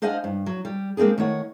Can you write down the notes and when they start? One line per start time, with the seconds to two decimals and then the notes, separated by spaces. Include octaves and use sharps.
0.02 D4 C5 D#5 F5 F#5 G#5
0.24 G2
0.46 F#3
0.65 G3
0.97 G#3 A#3 C4 D4 G#4
1.18 D#3 A3 C#5 F#5